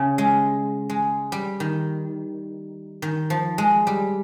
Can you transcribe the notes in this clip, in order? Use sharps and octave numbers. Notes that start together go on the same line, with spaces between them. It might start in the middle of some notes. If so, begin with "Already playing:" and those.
Already playing: C#3
G#3
G#3
G3
D#3
D#3
F3
G#3
G3